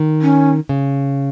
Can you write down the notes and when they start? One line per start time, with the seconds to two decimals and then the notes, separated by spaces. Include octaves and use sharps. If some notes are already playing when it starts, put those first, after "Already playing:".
Already playing: D#3
0.22 C#4
0.69 C#3